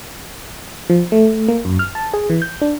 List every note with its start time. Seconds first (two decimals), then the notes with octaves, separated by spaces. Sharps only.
0.90 F3
1.12 A3
1.48 A#3
1.65 F#2
1.79 F6
1.95 A5
2.14 G#4
2.30 E3
2.42 G6
2.62 D4